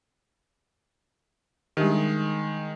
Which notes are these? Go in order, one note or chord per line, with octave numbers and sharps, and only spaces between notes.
D#3 G3 G#3 D4 G4